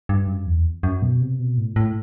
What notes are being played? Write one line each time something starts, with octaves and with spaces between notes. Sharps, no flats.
G2
F#2
E2
F#2
B2
C3
B2
A2
A2